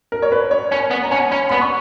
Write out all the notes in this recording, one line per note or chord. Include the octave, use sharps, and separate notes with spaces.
A#4
C#5
B4
C#5
C#4 G#5
B3
A#5
C#4 G#5
C#4 B5
B3 B5
C#6